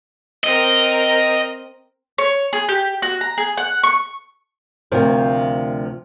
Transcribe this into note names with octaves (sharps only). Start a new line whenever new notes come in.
C4 A#4 D#5
C#5
G#4
G4
F#4
A#5
G#4
F#5
C#6
D2 C3 F3 A#4